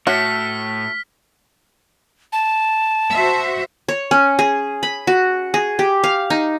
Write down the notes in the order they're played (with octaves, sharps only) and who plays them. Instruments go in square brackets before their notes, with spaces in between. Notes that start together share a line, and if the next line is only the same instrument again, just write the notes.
[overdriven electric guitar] A2 [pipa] A3 C#5 [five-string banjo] F#4 [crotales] F6 B6
[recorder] A5
[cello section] F#4 C5 E5
[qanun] C#5
C#4
G#4
B5
F#4
G#4
G4
F5
D#4